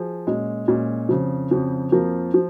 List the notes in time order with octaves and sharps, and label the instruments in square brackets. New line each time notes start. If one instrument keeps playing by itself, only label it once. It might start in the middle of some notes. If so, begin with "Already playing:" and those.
Already playing: [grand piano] F3 G#4
A#2 G#3 C#4
A#2 G#3 C#4
F2 C#3 F3
F2 C#3 F3
F2 F3 A#3 F4 A#4
F3